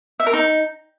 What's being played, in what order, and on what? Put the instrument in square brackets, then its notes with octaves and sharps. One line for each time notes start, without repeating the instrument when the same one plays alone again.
[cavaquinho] E5
A#4
D#4